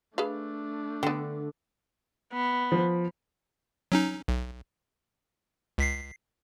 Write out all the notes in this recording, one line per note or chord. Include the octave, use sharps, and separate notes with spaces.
A3 D4 G#4 B4 F5
D3 B3 G5
B3
F3
F#3 C#4 D#4
B1
C#2 B6 C7